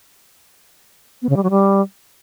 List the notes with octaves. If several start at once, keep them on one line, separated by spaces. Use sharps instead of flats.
B3
C#3
G3
F#3
G3